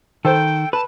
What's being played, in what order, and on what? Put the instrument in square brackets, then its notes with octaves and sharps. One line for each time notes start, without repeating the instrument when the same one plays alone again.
[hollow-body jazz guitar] D#3 [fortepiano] A4 C5 [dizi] G5
[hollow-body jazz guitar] B4 [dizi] A5